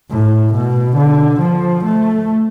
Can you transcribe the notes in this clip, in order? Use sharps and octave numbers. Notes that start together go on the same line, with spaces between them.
A2
B2
D3
F3
A3